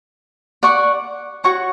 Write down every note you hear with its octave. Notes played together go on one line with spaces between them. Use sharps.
D5 F#5 C#6
F#4 C#5 F#5 C#6